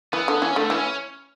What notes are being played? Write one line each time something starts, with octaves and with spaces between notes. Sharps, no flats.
E3 B3
D3
E3 C#4
D3 A3
E3 C#4